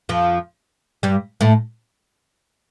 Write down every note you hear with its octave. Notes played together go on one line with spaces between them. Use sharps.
F2 F3
G2 G3
A2 A3